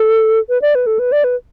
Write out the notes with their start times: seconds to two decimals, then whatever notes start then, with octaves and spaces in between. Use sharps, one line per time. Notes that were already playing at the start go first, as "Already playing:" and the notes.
Already playing: A4
0.49 B4
0.62 D5
0.75 B4
0.86 A4
0.99 B4
1.12 D5
1.24 B4